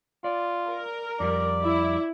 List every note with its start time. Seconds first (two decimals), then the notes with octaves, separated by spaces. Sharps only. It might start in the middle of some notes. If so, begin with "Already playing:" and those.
0.24 F4 D5
0.68 A#4
1.20 F2 G3 D5
1.63 E4